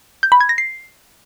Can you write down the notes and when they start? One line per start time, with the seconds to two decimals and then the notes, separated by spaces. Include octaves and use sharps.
0.23 G6
0.32 B5
0.41 G#6
0.49 A#6
0.58 C7